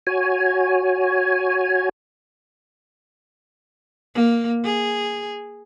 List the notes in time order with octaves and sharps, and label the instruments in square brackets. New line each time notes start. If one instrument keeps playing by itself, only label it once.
[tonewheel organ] F#4 C#5 G#5
[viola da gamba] A#3
G#4